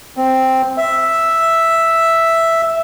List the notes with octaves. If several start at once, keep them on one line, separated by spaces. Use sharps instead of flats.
C4
E5